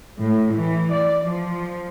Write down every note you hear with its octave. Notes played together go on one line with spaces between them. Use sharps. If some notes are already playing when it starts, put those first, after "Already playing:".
A2
E3
D5
F3